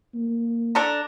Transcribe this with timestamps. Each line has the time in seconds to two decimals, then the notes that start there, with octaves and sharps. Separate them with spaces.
0.15 A#3
0.75 D4 A4 A#5